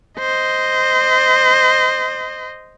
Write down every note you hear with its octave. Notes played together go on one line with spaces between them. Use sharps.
C5 D#5